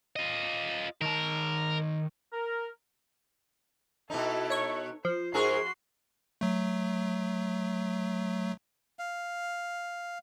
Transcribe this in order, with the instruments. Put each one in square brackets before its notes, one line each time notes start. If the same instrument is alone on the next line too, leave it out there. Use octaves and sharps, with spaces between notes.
[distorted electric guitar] F4 D#5
[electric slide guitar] D#3 A5 [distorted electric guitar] A#4
[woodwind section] A#4
[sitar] B2 D#4 [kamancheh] E4 A4
[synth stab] C#5 C#6
[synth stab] F3 [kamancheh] C5
[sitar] G#2 G#4 A#4 [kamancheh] F#4 C6
[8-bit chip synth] F#3 A3
[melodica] F5